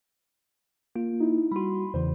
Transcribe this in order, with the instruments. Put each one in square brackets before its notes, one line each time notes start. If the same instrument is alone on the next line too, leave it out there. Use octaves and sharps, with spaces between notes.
[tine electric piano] A#3 F4
[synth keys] D#4 E4
[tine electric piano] G3 F#4 [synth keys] B5 C6
[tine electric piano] E2 C#3 E3 [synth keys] C5